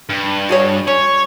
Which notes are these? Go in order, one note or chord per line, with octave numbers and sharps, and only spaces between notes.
G2
F#4 G#4 C#5
C#4 C#5